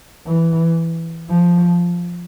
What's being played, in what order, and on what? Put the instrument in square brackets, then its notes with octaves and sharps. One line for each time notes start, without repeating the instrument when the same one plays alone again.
[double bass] E3
F3